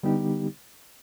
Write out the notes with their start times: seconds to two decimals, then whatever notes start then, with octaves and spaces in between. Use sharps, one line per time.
0.03 D3 G3 B3 D#4 G4